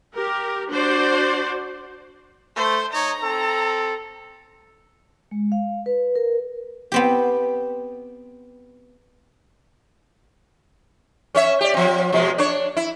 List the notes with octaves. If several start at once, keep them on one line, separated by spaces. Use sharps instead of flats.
G4 A#4
D4 F#4 C5 D5
A3 C5
D#4 C#5 A#5
C4 A4
G#3
F5
B4
A#4
B3 C4 G4
C#4 C#5 E5
G4 D5
F3 C4
B2 F3 G#3
D4 C#5
E4